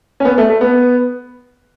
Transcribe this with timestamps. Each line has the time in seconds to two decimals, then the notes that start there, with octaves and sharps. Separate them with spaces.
0.20 C#4
0.25 B3
0.38 A3
0.50 A3
0.61 B3